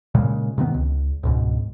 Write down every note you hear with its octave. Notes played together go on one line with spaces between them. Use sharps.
A#2 C#3 G#3
C3 D#3 F3 B3
C#2
C#2 G#2 B2